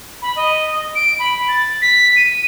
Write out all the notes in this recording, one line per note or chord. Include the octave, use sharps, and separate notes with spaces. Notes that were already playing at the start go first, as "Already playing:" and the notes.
B5
D#5
D7
B5
A6
B6
D#7